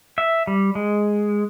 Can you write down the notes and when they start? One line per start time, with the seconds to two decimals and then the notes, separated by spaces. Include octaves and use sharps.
0.18 E5
0.47 G3
0.75 G#3